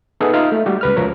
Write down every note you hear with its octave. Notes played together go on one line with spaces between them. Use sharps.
B3 D#4 G#4 A4
D#4 F4 F5 F6
A3
G3 F#4 G4
C#2 B4 F6
C#2 F3 A#4 C#5